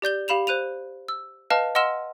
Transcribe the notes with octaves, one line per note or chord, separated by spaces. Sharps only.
G4 D5 G6 G7
G4 F5 B5 E7 F7
C5 F#6 D#7 F7
E6
B4 D#5 F5 A5 F6
D#5 F#5 C6 E6 F6 E7